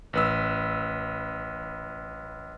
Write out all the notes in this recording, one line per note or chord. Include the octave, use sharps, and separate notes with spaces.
A1 B4 E6